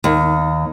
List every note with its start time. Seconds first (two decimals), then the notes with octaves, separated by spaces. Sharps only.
0.04 D#2